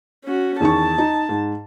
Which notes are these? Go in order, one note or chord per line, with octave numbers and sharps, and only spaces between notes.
C#4 F#4
E2 D#3 A5 C#6
D#4
G#2